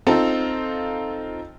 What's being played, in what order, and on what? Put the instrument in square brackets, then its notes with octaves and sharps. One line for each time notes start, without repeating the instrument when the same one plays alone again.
[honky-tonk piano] C4 D#4 F4 A4